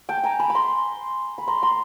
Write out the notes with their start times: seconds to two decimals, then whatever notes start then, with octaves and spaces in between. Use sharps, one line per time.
0.09 G5 A5
0.24 G#5 A#5
0.39 A5 B5
0.50 B5
0.55 A#5 C6
1.38 B5
1.47 A#5 C6
1.62 A#5 C6